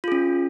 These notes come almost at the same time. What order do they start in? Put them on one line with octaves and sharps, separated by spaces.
F4 G#4 C#4